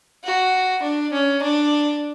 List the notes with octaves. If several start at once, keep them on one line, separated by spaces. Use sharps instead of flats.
F#4
D4
C#4
D4